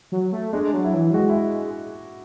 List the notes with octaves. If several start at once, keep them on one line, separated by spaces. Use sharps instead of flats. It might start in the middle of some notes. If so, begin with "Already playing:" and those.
F#3
A3
G#3 D4
F#3
E4
E3
F#3
G#3 F#4
E4